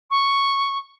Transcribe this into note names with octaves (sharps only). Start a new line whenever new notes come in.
C#6